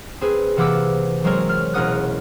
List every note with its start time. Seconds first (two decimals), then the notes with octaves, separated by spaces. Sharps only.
0.21 C4 G#4 B4
0.57 C3 E3 A#3 F#5 D6 E6
1.24 F#3 G#3 C4 A#4 C#5
1.49 F6
1.74 E1 C#4 A#4 F#5 D#6 F#6